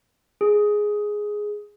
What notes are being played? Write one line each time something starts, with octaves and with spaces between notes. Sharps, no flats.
G#4